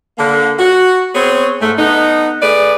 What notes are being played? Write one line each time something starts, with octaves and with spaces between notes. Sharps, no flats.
D3 A#3
F#4
B3 C4 G#4 C#5
G#2 A3
D3 B3 D#4
A3 G#4 B4 D5